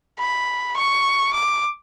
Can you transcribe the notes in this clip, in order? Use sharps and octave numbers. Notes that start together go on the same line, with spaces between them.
B5
C#6
D6